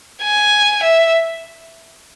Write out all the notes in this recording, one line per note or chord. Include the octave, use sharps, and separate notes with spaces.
G#5
E5